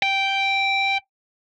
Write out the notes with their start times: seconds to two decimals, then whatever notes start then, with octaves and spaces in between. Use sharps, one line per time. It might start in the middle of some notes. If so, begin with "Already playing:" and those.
0.02 G5